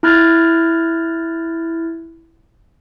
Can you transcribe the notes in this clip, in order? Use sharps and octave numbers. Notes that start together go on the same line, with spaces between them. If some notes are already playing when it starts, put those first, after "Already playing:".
E4 A#5 F6 F#6 G#6 A6